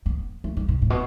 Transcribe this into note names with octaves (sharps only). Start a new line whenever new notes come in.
B3
A3
G3
B2
A2
B2